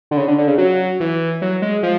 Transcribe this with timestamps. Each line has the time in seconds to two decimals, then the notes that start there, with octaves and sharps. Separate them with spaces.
0.11 D3
0.17 C#3
0.28 D3
0.38 D3
0.47 C#3
0.58 F#3
1.00 E3
1.42 F#3
1.62 G#3
1.83 F3